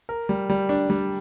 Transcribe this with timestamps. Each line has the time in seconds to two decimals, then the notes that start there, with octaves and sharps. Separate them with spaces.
0.09 A#4
0.29 G3
0.50 G3
0.69 D4
0.90 G3